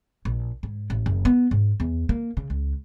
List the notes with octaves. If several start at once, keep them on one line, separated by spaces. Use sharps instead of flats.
A#1
G#2
A1
F#1
B3
G#2
E2
A#3
C#3
C#2